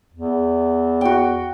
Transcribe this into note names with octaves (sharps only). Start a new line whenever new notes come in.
E2
F#4 G5